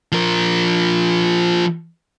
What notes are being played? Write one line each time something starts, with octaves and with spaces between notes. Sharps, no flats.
F3 A#4